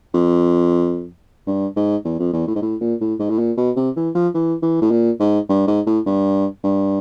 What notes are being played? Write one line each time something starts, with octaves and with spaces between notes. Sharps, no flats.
F2
G2
G#2
E2
F2
E2
A2
G#2
A2
A#2
A2
G#2
A2
A#2
B2
C3
E3
F3
E3
E3
A2
A#2
G#2
G2
G#2
A2
G2
G2